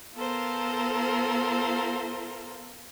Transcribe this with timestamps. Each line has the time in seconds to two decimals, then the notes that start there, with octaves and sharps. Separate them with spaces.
0.15 B3 F4 A4 A#4 C5